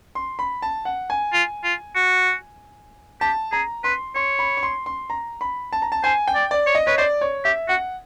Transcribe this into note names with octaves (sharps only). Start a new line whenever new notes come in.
C6
B5
A5
F#5
G#5
F4
F4
F#4
G4 A5
G#4 A#5
B4 C6
C#5 C6
B5
C#6
C6
C6
A#5
B5
A5
A#5
A5
C5 G#5
G5
D5
D5
C#5
D#5
B4 C#5
C5 D5
C#5
G4 E5
F#4 F#5